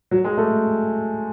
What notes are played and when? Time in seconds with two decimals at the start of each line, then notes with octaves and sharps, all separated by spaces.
0.11 F#3
0.24 G#3
0.37 A3